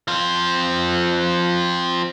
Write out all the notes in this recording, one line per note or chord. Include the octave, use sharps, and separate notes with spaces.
F3 C4